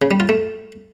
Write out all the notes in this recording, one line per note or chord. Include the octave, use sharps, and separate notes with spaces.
C#3
G3
F4
A3